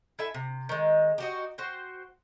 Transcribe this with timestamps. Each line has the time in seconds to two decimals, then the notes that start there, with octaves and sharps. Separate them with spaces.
0.19 E4 A4 E5 G#5
0.34 C3
0.69 D#3 G#3
1.18 D#4 F#4 G4
1.58 F#4 C5 G5